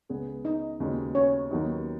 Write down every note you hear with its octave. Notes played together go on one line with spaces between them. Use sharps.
C#2 C#3 B3 G#4
D#4 D#5
D#2 C#3 G#3 B3 F#4
C#4 C#5
D#2 D#3 F#3 B3 D#4